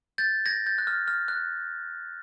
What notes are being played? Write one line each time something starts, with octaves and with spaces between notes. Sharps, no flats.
G6 A6
G#6 A#6
G6 A6
F#6
F6
F6
F#6